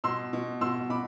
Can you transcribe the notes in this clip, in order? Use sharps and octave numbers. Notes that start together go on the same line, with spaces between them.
B2 C6 E6
B2
B2 C6 E6
B2 B5 D6